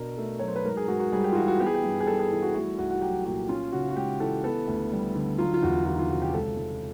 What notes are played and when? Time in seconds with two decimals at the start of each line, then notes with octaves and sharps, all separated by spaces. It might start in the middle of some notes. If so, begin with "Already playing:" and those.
Already playing: B2 D4 A#4
0.18 A3
0.39 F#3 C#5
0.48 C5
0.56 B4
0.65 G#2 A#4
0.77 G#4
0.88 G#2 F#4
1.00 F#4
1.12 G3 G#4
1.24 G4
1.32 F4
1.35 E3 F#4
1.48 F#4
1.60 B3 G4
1.66 G#4
1.74 G4
1.84 G2
2.00 G#4
2.07 G3 A4
2.19 G#4
2.31 E3
2.42 F#4
2.54 A3 F#4
2.78 C2 F#4
2.90 F#4
3.01 F#3 G4
3.25 A#2 F#4
3.49 C#4 F4
3.73 C#3 F#4
3.91 F#4
3.96 G#3 G4
4.20 E3 A4
4.44 B3 A4
4.68 D2
4.92 G3
5.15 D3
5.38 F#3 F4
5.54 F4
5.63 E2 F#4
5.86 D#3 F4
5.99 F4
6.10 C3 F#4
6.22 G4
6.34 C#2 A4
6.57 C#2